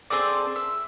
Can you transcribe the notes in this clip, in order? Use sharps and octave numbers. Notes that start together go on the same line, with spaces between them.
C4 G#4 A4 D5
E5